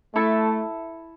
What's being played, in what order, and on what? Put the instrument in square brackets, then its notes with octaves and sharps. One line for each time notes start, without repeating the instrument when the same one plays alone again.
[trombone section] A3 [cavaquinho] E4 A4 E5 A5